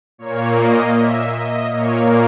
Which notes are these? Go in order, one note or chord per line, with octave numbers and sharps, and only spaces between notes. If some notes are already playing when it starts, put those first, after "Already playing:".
A#2 A#3 C#5
D#5
E5
D#5
A#2 A#3 C#5